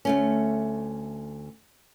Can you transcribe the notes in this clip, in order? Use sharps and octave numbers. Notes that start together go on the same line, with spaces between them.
D2 A3 C#4